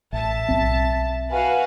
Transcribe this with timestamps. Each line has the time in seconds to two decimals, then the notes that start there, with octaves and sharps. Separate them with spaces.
0.13 A1 E5 A5
0.48 B1 C4
1.31 F#4 B4 F5 G#5